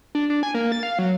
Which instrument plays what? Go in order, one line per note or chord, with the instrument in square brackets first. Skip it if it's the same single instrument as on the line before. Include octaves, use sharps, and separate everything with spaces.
[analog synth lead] D4
D4
G#5
A#3
A6
F5
F#3